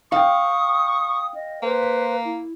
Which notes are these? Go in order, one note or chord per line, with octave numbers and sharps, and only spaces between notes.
F5 G5 C#6 D#6
D#5
A#3 B4 C5
E4